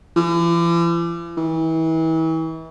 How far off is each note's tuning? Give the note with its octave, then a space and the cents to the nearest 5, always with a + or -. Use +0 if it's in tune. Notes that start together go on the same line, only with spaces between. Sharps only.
E3 +45
E3 -35